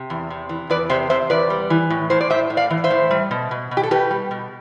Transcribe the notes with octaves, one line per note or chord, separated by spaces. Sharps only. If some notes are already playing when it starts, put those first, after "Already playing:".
Already playing: C3
E2
C3
E3
E2 B4 D5
C3 C5 E5
C3 C5 E5
E2 B4 D5
G3
E3
A2
A2 C5
D5
A2 C5 E5
A2
D5 F5
E3
C5 E5
A2
G3
B2
B2
B2
G4
A4
B2 G4 B4
G3
B2